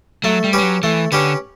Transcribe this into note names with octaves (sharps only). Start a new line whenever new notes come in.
F#3 A3
G3
C#4 G4 B4
G3
F#3
E3 A3
D3 C#4 G4 B4